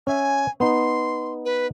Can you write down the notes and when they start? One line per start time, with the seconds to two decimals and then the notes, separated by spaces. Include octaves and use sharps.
0.07 C#4 E5 G#5
0.60 B3 D#4 C6
1.45 B4